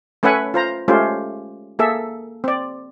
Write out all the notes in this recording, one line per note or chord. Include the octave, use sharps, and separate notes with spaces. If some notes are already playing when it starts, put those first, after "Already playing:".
A3 C#4 B4 E5 F#5 G#5
F4 C5 A#5
G#3 A3 C#4 F4 G4 C5
A#3 G#4 A4 E5
C4 D5